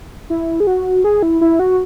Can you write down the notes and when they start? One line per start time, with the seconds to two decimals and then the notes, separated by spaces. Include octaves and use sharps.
0.30 E4
0.60 G#4
0.67 F#4
1.04 G#4
1.23 E4
1.41 E4
1.59 F#4